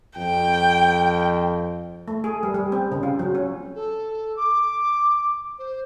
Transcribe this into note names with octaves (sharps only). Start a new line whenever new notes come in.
F2 G5
A3
G#4
G3
G3
C4
C#3
F4
F#3
C#4
A4
D6
C5